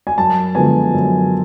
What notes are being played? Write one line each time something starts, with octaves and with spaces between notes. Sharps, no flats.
G#5
F#2 A5
D3 F3 G#3 B3 G#5
F#2